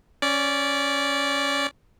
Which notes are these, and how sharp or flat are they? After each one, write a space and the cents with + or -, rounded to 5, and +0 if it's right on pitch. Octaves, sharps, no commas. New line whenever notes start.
C#4 +0 D5 -15